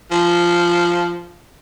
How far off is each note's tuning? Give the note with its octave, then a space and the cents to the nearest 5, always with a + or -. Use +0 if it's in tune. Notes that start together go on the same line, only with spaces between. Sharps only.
F3 -10